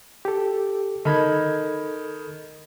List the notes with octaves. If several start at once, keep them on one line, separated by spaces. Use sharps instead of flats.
G4 A4
D#3 A4 B5 G#6